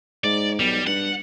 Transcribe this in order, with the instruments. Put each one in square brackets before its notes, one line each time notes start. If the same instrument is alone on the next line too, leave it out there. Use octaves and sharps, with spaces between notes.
[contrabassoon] G#2 [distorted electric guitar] D5
[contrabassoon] B1 [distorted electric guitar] G3
[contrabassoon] G2 [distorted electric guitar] F#5